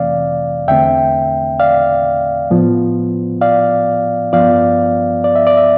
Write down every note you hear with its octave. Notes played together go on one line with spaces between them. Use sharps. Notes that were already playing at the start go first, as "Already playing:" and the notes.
Already playing: F2 C3 E3 A3 C4 D5 F5
E2 D3 A3 C4 E5 G5
D5 F5
A2 F3 B3
D5 F5
G2 F3 B3 D5 F5
D5
E5
D5
E5